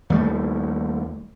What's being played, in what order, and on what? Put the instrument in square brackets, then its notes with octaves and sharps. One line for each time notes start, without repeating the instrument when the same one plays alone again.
[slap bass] D#2 G3 A3